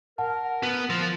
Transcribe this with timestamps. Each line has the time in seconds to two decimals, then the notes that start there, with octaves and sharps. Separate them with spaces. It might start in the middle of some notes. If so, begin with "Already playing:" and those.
0.18 A#4 F#5 A5
0.63 B3
0.90 F3 A6 A#6